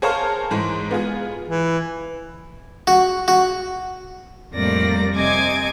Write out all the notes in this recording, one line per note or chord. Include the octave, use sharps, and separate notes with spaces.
G#4 A#4 C5 C#5 F5 A5
G#2 E3 G#3
B3 F4 G#4
E3
F#4
F#4
F2 A2 G3 A#3 D5 A#6
C3 D#5 G#5 D6 G#6